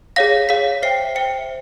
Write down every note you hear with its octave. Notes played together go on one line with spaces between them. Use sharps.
G#4 C#5 F5 A#6
G#4 C#5 F5 B6
C5 E5 G5 C7
C5 E5 G5 C#7